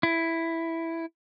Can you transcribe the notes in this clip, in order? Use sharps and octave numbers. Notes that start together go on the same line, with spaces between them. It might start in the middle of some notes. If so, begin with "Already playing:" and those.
E4